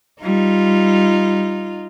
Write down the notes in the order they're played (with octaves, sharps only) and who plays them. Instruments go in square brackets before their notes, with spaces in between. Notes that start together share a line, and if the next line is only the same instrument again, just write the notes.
[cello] G3 [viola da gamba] D#4 F4